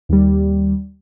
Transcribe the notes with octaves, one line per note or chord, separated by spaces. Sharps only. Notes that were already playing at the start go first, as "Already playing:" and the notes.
D#2 G3